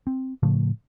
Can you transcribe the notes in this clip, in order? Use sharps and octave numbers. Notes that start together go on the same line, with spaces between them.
C4
A2 C#3 F3 A3